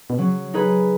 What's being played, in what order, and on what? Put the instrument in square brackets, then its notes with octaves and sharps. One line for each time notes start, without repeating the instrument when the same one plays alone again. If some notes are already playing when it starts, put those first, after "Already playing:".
[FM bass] B2
[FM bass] C#3 [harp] F#3
[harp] D#4 G#4 B4